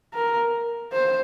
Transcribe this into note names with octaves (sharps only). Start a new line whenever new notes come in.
A#4
C5